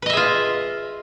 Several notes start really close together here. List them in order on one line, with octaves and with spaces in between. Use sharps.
B4 D#5 E5 G#4 F4